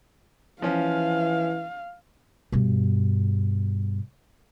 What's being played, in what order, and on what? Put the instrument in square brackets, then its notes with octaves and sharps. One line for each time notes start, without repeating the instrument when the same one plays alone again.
[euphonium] E3 [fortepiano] F3 C#4 [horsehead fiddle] F5
[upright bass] G2 B2